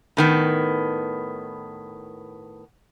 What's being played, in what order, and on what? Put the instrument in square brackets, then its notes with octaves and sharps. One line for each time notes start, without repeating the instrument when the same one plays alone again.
[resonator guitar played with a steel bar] A2 D#3 B3